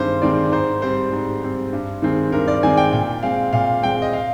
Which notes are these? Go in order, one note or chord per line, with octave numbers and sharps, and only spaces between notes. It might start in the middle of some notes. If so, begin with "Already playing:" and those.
Already playing: G2 D#3 G#3 C4 C5
D#3 G#3 C4 D5
G#2 C5
G3 C4 C5
G#2
G3 C4
G2
D#3 G#3 C4
G2 A#4
D5
D#3 G#3 C4 G#5
G5
A#2 G5
G#3 C4 F5
A#2 F5
G#3 C4 G5
D#5
F5